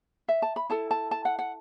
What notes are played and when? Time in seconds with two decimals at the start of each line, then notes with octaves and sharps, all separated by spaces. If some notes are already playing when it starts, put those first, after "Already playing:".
0.28 E5
0.42 A5
0.56 B5
0.70 E4 A4 A5
0.91 A5
1.11 A5
1.25 F#5
1.39 F#5